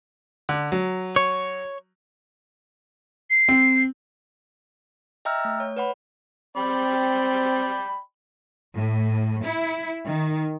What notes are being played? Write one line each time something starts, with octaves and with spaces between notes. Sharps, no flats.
D3
F#3
C#5
C7
C4
D#5 E5 G5 A#5 E6 F6
A3
C#5
B4 C#5 F#5 B5
C4 D5 G5 B5
A2
E4
D#3